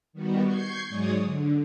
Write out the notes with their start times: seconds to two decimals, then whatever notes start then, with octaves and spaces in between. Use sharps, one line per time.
0.13 D#3 G3 B3 F#4
0.45 C#6 G6 G#6 C7
0.89 G#2 F#3 G#3 C#5 D5 D#6
1.23 D3